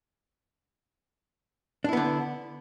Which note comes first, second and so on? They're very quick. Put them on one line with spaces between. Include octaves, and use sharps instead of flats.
D4 E4 B3 D3